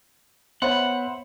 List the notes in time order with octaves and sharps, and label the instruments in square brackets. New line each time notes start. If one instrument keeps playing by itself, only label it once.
[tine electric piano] B3 C#5 [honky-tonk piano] C5 E5 B5 [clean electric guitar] F#5